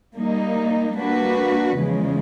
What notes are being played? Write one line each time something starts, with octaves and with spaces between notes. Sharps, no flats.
G3 A#3 D#4
G3 A#3 D4 F#4 B4
E2 C#3 F3 G#3